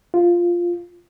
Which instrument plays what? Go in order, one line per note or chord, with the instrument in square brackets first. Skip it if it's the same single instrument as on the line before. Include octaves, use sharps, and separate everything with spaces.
[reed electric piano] F4